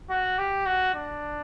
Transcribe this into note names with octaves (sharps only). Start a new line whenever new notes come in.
F#4
G4
F#4
D4